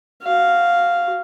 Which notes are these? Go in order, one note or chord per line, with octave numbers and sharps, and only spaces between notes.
F#4 F5